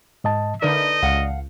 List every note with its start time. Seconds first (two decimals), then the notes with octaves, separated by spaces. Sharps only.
0.24 G#2 D#5 A5
0.62 D3 A3 D#4 A#4 B4 D5 D#5
1.03 C#2 F5 F#5